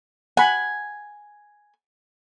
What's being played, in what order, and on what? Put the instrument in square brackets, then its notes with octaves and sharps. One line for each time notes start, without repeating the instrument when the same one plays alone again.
[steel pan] F#5 B5 [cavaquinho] G#5